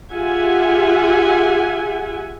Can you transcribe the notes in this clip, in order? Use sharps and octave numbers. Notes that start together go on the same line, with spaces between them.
F4 G4 G#4 E5 F#5 G#5